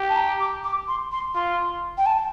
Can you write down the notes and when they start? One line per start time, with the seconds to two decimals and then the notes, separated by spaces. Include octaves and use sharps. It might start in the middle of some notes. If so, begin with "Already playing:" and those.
Already playing: G4
0.09 A5
0.16 A#5
0.40 D6
0.64 D6
0.88 C6
1.12 C6
1.35 F4 C6
1.98 G5
2.06 A5